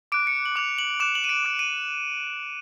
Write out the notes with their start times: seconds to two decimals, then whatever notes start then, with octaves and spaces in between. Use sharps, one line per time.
0.12 D6 F#6 D7
0.27 C#7
0.46 F#7
0.56 D6 F#6 F7
0.78 F#7
1.00 D6 F#6 E7
1.15 F#7
1.24 D#7
1.29 D7
1.45 D6 F#6
1.59 D#7